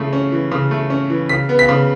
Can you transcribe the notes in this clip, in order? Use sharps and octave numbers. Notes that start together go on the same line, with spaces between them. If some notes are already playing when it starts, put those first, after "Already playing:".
Already playing: C#3 E3 A3
C#4
E3
C#3
A3
C#4
E3
C#3 B6
B3
B6
C#3